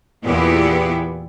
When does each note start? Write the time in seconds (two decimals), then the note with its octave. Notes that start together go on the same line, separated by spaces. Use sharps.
0.23 E2 A#2 B3 E4 G4 G#4